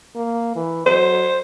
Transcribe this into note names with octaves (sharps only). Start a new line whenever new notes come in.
A#3
E3
F#3 C5